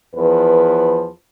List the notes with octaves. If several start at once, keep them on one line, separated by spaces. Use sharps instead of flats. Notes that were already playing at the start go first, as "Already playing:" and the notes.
E2 F3 B4